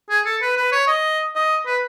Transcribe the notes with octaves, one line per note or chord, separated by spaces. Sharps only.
G#4
A4
B4
B4
C#5
D#5
D#5
B4